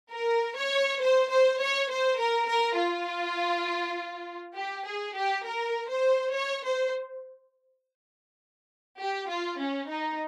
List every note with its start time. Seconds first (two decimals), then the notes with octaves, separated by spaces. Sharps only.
0.12 A#4
0.56 C#5
1.01 C5
1.30 C5
1.60 C#5
1.90 C5
2.19 A#4
2.49 A#4
2.78 F4
4.56 G4
4.85 G#4
5.16 G4
5.45 A#4
5.89 C5
6.34 C#5
6.63 C5
9.00 G4
9.29 F4
9.60 C#4
9.90 D#4